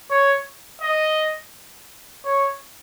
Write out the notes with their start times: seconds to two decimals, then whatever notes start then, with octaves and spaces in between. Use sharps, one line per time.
0.10 C#5
0.82 D#5
2.25 C#5